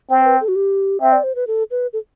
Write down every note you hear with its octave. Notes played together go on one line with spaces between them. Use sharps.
C4 C5
B4
A4
F#4
G4
C4 E5
D5
C5
B4
A4
B4
A4